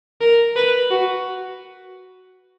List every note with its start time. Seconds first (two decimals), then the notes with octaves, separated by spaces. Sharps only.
0.21 A#4
0.56 B4
0.91 F#4